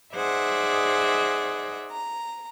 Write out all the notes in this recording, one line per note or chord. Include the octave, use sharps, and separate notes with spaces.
D#4 G#4 C5 D5 E5 F#5
A#5